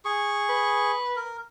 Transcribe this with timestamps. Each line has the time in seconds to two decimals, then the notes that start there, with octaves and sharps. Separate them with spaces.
0.05 G#4 C#6
0.49 B4
1.16 A#4